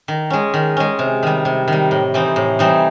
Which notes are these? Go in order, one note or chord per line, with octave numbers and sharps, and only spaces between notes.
D#3
G#3 C#4
D#3
G#3 C#4
C3
D#3 G3
C3
D#3 G3
A2
E3 G3 C4 D#4
A2
E3 G3 C4 D#4